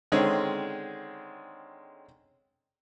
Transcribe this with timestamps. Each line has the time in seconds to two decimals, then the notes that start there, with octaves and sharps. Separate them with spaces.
0.12 D3 D#3 G#3 C4 C#4